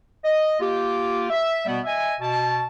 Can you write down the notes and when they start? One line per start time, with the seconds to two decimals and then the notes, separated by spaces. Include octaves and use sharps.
0.24 D#5
0.60 A#3 F4 G4
1.30 E5
1.66 B2 G3 B3
1.85 D#5 E5 G#5
2.21 B2 A5